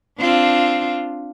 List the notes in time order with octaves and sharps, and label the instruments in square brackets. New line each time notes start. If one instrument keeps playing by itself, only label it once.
[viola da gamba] C4 D4 F4